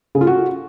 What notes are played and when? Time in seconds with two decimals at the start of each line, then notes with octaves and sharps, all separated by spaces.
0.15 C#3
0.21 F4
0.27 F#4